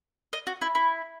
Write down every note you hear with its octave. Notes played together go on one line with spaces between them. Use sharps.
D#5
F#4
E4
E4